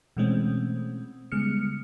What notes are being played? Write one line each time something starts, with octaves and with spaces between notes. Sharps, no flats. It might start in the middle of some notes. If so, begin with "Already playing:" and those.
B2 E3 G#3 A3 C4 C#4
C#3 G3 G#3 B3 F6 C#7